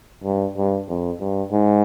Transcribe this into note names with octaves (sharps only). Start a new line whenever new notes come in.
G2
G2
F2
G2
G#2